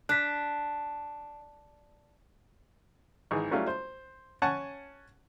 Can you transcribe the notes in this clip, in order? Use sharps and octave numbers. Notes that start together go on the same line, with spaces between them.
D4 F#6 B6
G#1 E3 G#4
F#3 G3 A3 C#4 E4 F4
C5
C#4 F#5 G#5 A5 C#6